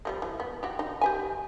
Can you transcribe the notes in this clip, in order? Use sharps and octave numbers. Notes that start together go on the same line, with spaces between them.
F3 G3 A#3
E3
B3
F#4 G4
D#4
G4 B4 G#5